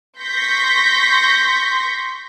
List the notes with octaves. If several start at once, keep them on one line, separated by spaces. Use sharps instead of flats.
C6 C#6 G6 A#6 B6